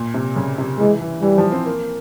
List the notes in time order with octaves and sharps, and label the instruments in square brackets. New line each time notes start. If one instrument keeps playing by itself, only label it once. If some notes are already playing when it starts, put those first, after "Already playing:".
Already playing: [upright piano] A#2
C3
C#3
C3
[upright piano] E3 [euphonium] G#3
[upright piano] E3
[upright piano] E3 [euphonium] G3
[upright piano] F3
C4
A#3